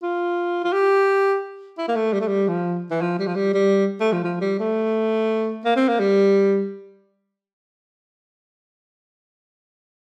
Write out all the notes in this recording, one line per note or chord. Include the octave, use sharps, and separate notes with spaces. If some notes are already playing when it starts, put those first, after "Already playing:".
F4
F4
G4
E4
A#3
A3
G3
A3
G3
F3
E3
F3
G3
F3
G3
G3
A3
F3
F3
G3
A3
A#3
C4
A#3
G3